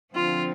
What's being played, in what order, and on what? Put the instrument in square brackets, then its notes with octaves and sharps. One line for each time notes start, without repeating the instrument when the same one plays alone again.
[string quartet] D3 F3 C4 F4